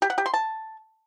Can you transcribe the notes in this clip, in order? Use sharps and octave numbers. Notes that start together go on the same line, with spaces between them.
G4
F#5
G4
C6
A5